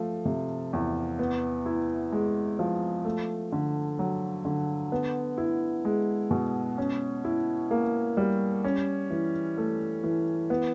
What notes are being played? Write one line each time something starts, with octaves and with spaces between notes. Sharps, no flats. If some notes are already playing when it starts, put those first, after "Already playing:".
Already playing: F3 A3
C3
E2
B3
E4
G#3
F3
A3
D3
F#3
D3
B3
E4
G#3
B2
C#4
E4
A#3
G3
C#4
E3
A3
E3
B3